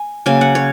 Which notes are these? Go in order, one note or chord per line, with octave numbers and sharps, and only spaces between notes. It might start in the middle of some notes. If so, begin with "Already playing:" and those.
Already playing: G#5
C#3 F#3 A#3 G#5
F#5
C#5